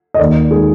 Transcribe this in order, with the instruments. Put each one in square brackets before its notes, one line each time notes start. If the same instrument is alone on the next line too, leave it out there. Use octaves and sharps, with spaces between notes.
[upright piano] D#5
D#2 D5
D#3 G#3 G#4